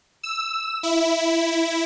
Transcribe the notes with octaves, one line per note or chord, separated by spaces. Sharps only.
E6
E4